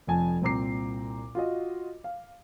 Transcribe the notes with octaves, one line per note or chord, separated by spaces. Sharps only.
F1 F2 G#5 A5
C2 A#2 C4 A#5 D6 C7
F4 F#4 D#5
F5